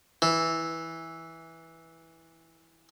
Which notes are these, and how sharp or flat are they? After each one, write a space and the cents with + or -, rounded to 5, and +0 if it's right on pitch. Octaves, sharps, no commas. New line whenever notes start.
E3 -10